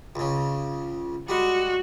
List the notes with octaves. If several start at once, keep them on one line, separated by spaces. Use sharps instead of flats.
C#2 C#3
G3 G#3 F#4